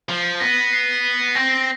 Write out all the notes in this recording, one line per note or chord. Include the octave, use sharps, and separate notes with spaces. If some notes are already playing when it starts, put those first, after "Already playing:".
F3
B3 A#6
C7
C4 A#6